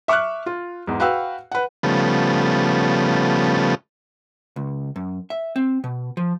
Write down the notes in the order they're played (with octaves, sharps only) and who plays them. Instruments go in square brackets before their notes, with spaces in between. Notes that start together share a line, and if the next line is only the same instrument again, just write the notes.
[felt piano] E5 C#6 D6 F6 F#6
F4
E2 G#2
F#4 B4 F5 G5 E6
B4 F#5
[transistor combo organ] C#3 F3 G3 A3 B3
[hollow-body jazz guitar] C#2
F#2
E5
C4
B2
F3